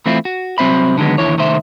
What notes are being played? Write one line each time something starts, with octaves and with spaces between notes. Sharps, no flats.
E3 A3 C4 E4 F4
F#4
C2 F#3 C4 C5 E5 B5
D3 D#3 F#3 G#3 B3
D#2 D3 E3 E4 C#5
C2 D#3 A3 C5 E5